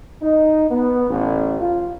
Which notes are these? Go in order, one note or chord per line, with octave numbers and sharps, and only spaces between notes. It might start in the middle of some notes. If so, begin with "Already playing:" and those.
D#4
B3
A1
F4